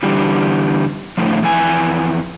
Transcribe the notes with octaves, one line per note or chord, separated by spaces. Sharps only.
D3 E3 G3
A2 D3 F3
F2 E3 G#5